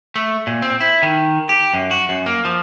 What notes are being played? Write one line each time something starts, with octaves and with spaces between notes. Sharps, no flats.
A3
A#2
C4
E4
D#3
G4
F#2
F#4
F#2
A#3
F3